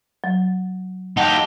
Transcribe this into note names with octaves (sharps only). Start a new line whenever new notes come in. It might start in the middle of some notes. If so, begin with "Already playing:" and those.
F#3
D#4 G4 F#5 A5